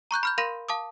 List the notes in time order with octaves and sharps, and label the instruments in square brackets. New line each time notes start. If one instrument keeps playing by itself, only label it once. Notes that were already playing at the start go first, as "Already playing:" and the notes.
[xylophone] A#5 C#6 F#6 G6
B5 F6 G6
A#4 F5 B5 C6 A#6 D#7
F5 A5 D6 D#6